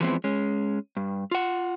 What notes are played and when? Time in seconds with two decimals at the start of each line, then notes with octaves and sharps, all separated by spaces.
0.01 E3 F3 G#3 B3 C4 E4
0.24 G#3 C#4
0.97 G2
1.31 F4 F#5